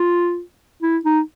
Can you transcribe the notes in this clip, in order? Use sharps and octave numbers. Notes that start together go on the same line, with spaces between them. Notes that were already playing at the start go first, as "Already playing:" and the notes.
Already playing: F4
E4
D#4